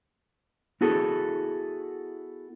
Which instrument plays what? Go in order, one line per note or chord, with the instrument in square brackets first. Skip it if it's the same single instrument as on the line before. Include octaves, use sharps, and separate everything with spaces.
[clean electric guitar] B3 E4 F#4 G#4 A4